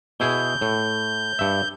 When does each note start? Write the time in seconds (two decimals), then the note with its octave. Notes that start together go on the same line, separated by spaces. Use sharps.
0.20 B2 E4 G#4 G6
0.61 A2
1.39 G2 E5